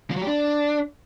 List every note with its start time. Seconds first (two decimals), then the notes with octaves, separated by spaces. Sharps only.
0.10 F3
0.16 F#3
0.21 G4
0.27 D4